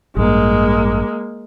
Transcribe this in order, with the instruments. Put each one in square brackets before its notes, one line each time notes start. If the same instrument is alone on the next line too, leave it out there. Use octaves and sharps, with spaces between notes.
[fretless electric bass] A1 G2 [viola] G#3 A#3